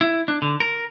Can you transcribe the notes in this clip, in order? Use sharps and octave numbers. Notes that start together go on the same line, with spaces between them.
E4
D4
D3
A#4